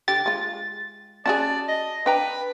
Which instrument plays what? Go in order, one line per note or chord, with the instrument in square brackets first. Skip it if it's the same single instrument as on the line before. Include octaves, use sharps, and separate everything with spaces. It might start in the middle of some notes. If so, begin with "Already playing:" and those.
[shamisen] D3 G4 [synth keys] A6
[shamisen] G#3 F4
[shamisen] C#4 F#4 G#4 [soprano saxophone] D5 [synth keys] A5
[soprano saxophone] D#5
[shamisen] D4 G5 A#5 [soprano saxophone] B4